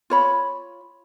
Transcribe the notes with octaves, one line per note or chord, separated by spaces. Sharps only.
F4 C#5 B5